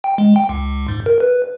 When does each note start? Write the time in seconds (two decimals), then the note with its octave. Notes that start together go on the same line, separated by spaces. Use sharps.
0.04 G5
0.18 G#3
0.36 G5
0.49 C#2
0.63 C#2
0.88 G#2
1.06 A#4
1.20 B4